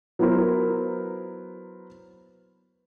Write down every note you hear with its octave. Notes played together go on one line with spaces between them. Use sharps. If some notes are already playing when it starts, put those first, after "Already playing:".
F#3 B3 E4 A#4 C5